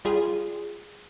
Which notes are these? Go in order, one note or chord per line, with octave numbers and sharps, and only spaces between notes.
G3 F4 G#4